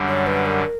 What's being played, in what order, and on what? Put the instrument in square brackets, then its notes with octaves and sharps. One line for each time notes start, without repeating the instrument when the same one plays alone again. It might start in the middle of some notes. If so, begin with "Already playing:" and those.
Already playing: [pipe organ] F#2 D3 G3
[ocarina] C#5
B4
A#4